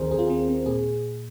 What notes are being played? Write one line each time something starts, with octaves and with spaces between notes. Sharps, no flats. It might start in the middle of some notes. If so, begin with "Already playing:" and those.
Already playing: D#2 D#3 C4 G#4 A#4 C5
D#2 G#4
F4
C4 G#4
C4
A#2 G#4